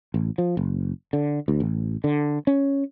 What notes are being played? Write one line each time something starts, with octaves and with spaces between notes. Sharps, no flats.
A1
F3
F#1
D3
D2
A1
D3
C#4